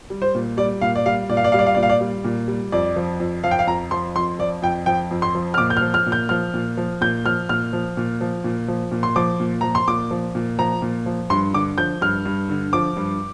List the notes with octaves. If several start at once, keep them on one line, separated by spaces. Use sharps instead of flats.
G3
C5
A#2
G3 D5
A#2 F5
D5
G3 F5
A#2 D5
F5
D5
G3 F5
D5
F5
A#2 D5
F5
D5
G3
A#2
G3
F2 D5
F3
F2
F3 F5
G5
F5
F2 A#5
F3 C6
F2 C6
F3 D5
F2 G5
F3 G5
F2
C6
F3
F6
A#2 D6
G6
F6
F3
F6
A#2
G6
F3 F6
A#2
F3
A#2 G6
F3 F6
A#2 F6
F3
A#2
F3
A#2
F3
A#2
C6
F3 D6
A#2
F3 A#5
C6
A#2 D6
F3
A#2
F3 A#5
A#2
F3
G2 C6
D3 D6
F3 G6
G2 F6
G2
D3
F3 D6
G2